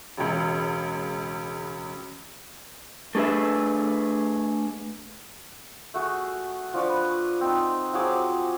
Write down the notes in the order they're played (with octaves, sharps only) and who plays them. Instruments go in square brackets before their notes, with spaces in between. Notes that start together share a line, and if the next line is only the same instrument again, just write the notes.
[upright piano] E1 C#2
[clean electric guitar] A3 D4 G#4 B4 E5
[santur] A3 F#4 G#4
F3 D4 C#6 D6
B4
C4 D#4
F3 F#3 G#4 D6